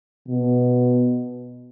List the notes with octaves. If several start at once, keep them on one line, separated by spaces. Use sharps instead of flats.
B2